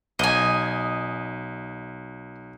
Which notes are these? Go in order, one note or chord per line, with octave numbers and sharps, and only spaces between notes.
B1 D#5 G#5